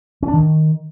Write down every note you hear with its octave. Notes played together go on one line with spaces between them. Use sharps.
C#4
D4
D#3